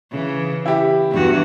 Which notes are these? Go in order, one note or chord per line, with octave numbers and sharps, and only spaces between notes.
C#3 E3
E4 G4
E2 G2 F#4